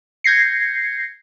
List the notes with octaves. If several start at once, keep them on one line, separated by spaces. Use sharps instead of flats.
G6 G#6 A#6 C7 C#7